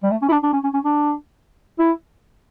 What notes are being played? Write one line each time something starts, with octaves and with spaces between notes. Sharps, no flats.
G3
A3
C#4
E4
D4
D4
C#4
C#4
C#4
D4
E4